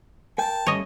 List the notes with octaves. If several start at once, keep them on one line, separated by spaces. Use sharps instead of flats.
A#4 G5 A5 G6
G3 A3 C#4 C#5 D#5